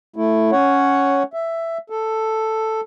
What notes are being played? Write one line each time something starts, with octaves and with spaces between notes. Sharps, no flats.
A3 E4
C#4 C#5 F#5
E5
A4